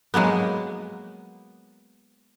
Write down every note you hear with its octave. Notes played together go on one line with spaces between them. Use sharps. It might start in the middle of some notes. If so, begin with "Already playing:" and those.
F#3 G#3 A#3 B3